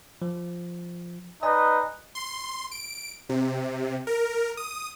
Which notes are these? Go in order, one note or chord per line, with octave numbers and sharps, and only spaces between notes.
F3
D#4 B4 D5 D#5 G#5
C6
D7
C3
A#4
D#6